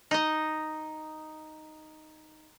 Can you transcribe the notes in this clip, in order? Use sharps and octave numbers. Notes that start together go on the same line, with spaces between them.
D#4 D#5